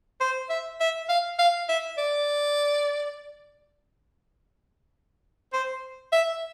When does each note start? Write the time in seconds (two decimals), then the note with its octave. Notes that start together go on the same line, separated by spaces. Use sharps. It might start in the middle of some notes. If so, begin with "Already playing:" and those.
0.20 C5
0.50 E5
0.80 E5
1.09 F5
1.39 F5
1.69 E5
1.98 D5
5.53 C5
6.12 E5